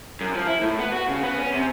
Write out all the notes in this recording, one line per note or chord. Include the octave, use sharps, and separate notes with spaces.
F#2
F3
E4
A2
B3
F#4
C#3
B3
C#4
C3